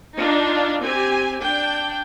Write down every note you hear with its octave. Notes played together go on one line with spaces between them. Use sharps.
D4 D#4 F4
C4 G4 G#5
D4 G5